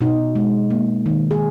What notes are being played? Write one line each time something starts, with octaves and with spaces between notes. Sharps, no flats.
B2 D#4
G#3
A#3
D#3
G#4